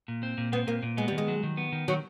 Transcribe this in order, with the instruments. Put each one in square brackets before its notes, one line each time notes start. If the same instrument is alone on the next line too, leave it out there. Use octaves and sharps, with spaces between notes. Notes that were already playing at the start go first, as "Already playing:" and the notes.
[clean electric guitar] A#2
C4
A#2
[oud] B3 [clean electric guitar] C4
[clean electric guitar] A#2 [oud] A#3
[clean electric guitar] A#2
[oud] G#3 [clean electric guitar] B3
[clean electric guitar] D#3 [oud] G3
[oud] G#3
[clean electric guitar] F#3
D#3
B3
D#3
[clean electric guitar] D#3 [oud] F#3